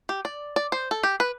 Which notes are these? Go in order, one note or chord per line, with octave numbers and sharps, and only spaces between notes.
G4
D5
D5
C5
A4
G4
B4